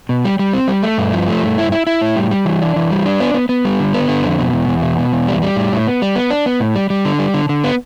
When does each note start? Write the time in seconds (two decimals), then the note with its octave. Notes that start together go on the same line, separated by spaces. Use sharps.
0.09 B2
0.25 G3
0.39 G3
0.53 C4
0.68 G3
0.83 A3
0.98 G2
1.12 F3
1.28 A3
1.42 G2
1.58 E4
1.72 E4
1.87 E4
2.01 A2
2.16 G3
2.31 G3
2.46 E3
2.61 D4
2.76 E3
2.91 G3
3.06 D4
3.20 B3
3.34 B3
3.49 B3
3.65 G3
3.80 D3
3.94 B3
4.08 D3
4.24 F2
4.39 B2
4.53 E2
4.68 E2
4.82 B2
4.98 B2
5.12 E2
5.28 G3
5.42 G3
5.56 A2
5.72 A2
5.87 B3
6.02 G3
6.16 B3
6.31 D4
6.46 B3
6.60 A2
6.76 G3
6.90 G3
7.05 D3
7.19 G3
7.34 D3
7.49 D3
7.64 B3